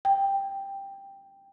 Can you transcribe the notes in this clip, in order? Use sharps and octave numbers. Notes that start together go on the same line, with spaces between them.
G5